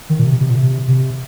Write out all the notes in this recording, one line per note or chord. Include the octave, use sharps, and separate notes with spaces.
D#3
A#2
C3
C3
A#2
C3
C3